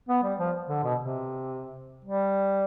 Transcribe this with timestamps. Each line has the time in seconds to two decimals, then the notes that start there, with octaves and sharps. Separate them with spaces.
0.09 B3
0.23 G3
0.39 F3
0.69 D3
0.83 B2
0.99 C3
2.05 G3